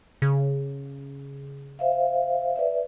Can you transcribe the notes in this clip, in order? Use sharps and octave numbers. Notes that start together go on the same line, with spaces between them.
C#3
C5 E5 F5
B4 D5 E5